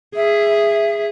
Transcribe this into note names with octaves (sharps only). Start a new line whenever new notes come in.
G#4 E5